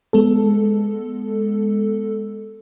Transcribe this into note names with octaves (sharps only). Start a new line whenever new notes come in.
G#3 B3 A4